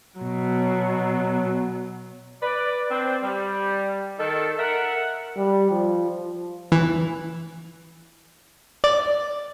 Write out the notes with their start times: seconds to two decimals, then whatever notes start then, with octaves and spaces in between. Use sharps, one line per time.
0.19 B2 F#3
2.43 B4 D5
2.91 C4 D4
3.23 G3
4.20 D#3 A4
4.59 A#4 E5 F#5
5.37 G3
5.71 F3
6.10 F3
6.72 E3
8.84 D5